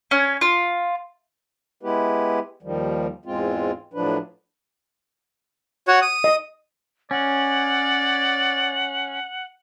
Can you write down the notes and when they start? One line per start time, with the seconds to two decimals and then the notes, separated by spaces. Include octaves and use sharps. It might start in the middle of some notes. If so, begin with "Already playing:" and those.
0.11 C#4 C#5
0.41 F4
1.83 G#3 B3 E4 G4 B4
2.63 D#2 D#3 F3 G3
3.25 E2 G#2 G#3 C4 F4
3.94 A2 F3 F#3 D4 B4
5.88 F#4 C#5 F#5
6.02 D#6
6.24 D#5
7.11 C#4 D5 F#5